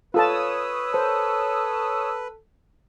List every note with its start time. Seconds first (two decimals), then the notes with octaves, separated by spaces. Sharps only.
0.14 F4 A4 B4 C#5 A5 D#6 E6
0.94 A4 C5